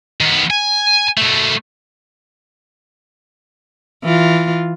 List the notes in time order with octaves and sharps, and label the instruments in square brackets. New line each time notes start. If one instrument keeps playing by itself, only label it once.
[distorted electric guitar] D#3 B3
G#5
B2 A3
[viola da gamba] E3 F4